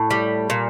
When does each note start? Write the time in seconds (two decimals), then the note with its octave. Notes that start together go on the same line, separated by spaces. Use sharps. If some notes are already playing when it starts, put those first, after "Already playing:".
Already playing: A2
0.11 G3
0.50 A#2